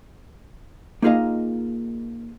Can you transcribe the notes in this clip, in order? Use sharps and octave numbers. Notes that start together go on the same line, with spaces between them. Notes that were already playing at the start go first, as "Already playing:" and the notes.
A#3 D#4 F4 G#4 D#5 F5